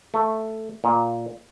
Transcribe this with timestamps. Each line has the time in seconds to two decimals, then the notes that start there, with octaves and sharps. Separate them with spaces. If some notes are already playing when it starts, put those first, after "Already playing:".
0.14 A3
0.84 A#2